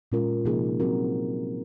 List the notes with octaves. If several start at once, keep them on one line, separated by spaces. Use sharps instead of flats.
A#2 G#3 C#4 F4 A#4
C3 F3 A#3 D#4 G#4
F#3 C4 F#4 A#4